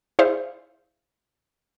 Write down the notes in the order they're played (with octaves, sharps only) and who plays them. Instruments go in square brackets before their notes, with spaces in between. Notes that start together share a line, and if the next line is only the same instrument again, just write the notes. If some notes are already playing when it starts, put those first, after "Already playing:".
[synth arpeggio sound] E4 G#4 C5 D5 E5 F5